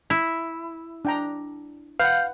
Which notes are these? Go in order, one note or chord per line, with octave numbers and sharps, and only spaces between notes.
E4
D4 G5 A#5
B4 F5 F#5 G6